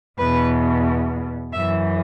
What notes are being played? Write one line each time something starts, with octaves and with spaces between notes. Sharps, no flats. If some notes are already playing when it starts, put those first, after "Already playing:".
E2 B2 B4
F#2 E3 E5